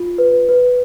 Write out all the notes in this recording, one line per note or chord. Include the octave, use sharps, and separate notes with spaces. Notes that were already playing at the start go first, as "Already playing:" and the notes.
Already playing: F4
B4
B4